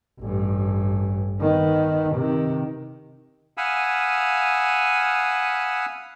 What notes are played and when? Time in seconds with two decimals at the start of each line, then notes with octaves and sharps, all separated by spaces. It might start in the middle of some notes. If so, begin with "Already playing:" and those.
0.20 A1 G2
1.40 D#3 B3
2.14 C3 D#3
3.57 F5 F#5 G#5 B5 D#6 E6